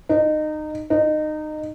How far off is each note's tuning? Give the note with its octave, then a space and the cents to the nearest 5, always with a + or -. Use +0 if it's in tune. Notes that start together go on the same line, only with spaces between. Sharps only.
D#4 -20
D#4 -20